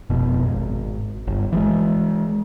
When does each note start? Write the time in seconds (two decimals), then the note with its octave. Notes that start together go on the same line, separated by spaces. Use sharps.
0.10 F1 B2
0.46 G#1
1.27 G1
1.53 E3 F3 G#3